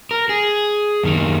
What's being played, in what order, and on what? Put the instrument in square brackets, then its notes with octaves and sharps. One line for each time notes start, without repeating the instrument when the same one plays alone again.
[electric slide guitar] A#4
G#4
F#2 D#3 A#3